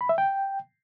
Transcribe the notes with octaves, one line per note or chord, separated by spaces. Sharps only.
B5
E5
G5